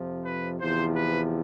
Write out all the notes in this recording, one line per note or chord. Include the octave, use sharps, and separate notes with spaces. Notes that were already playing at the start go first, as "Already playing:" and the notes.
Already playing: F2 C3 F3
B4
E2 C3 F3 C5
B4